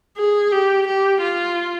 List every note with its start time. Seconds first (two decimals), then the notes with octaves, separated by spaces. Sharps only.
0.17 G#4
0.52 G4
0.87 G4
1.22 F4